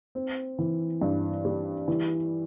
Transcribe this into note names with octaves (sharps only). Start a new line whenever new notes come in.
C4
E3
G2
G3
E3